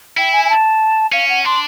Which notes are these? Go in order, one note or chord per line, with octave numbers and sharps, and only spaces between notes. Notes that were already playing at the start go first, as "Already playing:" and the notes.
E4 G5
G#5
G#5
A5
C#4 F5
F#5
D4 C6